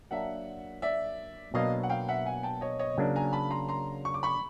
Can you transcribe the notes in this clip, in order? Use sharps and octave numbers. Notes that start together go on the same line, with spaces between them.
F#3 A#3 D4 E5 F#5
D5 E5
B2 F#3 A#3 D4 D#5 F5
F#5
F5 G5
E5 F#5
F#5 G#5
G5 A5
C#5 D#5
C#5 D#5
C#3 F#3 A#3 D4
G#5 A#5
A5 B5
A#5 C6
A#5 C6
C#6
D6
B5 C#6